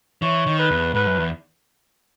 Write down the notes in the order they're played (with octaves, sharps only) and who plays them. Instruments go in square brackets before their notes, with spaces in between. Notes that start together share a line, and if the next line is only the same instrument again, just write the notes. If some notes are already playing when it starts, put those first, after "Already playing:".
[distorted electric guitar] E3 [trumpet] C#5
[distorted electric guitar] D#3
[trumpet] B4
[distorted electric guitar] E2
[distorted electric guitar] G#2 [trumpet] B4
[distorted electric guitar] F#2
E2